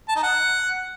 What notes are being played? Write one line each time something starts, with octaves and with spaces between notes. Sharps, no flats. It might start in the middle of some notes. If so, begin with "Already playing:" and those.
A5
D#4
F#5